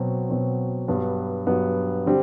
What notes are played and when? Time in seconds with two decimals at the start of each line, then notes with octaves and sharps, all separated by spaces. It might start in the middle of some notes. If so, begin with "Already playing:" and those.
Already playing: B2 F#3 C4
0.29 B2 F#3 C4
0.88 G2 F#3 B3
1.46 G2 F#3 B3
2.06 D3 G3 C4